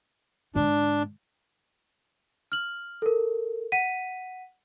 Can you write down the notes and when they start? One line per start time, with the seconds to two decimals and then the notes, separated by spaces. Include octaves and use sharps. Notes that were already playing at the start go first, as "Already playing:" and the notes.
0.55 G#2 D3 D4
2.52 F6 F#7
3.02 A4 A#4
3.72 F#5 B6 D#7